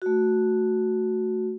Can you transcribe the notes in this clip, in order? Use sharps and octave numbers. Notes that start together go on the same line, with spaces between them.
A3 F#4